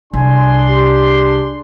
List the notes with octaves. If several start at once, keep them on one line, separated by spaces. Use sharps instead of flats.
C2 D4 G#4 G#5 C6
G4